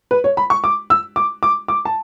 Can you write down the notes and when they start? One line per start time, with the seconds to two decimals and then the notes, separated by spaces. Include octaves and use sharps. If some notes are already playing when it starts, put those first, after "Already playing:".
0.11 B4
0.24 C#5
0.37 B5
0.50 C#6
0.64 D6
0.90 E6
1.16 D6
1.43 D6
1.68 D6
1.85 A5